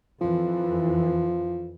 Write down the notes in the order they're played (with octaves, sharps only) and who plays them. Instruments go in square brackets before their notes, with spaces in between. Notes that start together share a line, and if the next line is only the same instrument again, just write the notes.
[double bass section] F2 E3 [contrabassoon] F3